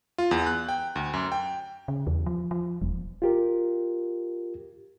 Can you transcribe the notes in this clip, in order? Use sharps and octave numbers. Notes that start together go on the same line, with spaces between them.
F4
E2
F#6
G5
D2
F#2
G5
C#3
E2
F3
F3
E1
F4 G4 A#4